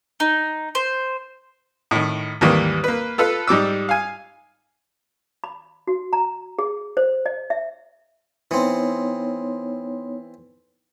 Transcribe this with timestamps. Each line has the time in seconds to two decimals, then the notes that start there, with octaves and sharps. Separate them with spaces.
0.20 D#4
0.75 C5
1.91 A2 D#3
2.41 D#2 G#2 E3 G3 A#3
2.84 A#3 B4
3.18 F4 A4 B4
3.47 G#2 G3 D6 E6
3.89 F5 G#5
5.44 B5
5.87 F#4
6.13 A#5
6.59 G#4
6.97 C5
7.26 D#5
7.50 E5
8.51 E3 B3 C4 D#4 C#5